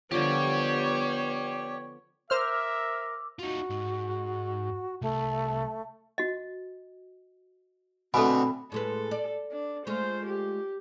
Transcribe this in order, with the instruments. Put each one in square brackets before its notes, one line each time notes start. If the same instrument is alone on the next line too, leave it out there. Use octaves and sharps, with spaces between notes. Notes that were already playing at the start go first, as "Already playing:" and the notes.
[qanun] D3 F3 [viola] B3 C#5 [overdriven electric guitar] G4 D5
[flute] A#4 [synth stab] C5 F6 [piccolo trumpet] E5 [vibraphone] D6 E6
[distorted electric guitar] D#4 F4 [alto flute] F#4
[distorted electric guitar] G#2
[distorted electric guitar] C2 [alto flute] A3
[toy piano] F#4 D#5
[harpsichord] B2 D3 A3 [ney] C4 [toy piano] A4 G#5 [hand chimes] B5
[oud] A2 G#3 B4 [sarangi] A4
[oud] D5
[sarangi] D4
[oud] G#3 A3 F4 [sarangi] C5
[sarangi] G4